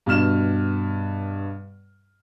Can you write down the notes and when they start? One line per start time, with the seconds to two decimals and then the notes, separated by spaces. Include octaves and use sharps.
0.06 G2 B2 F6 E7